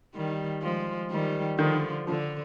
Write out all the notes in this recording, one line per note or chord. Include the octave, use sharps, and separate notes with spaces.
D#3 G3
F3 G#3
D#3 G3
D3 D#3 F3
D3 F3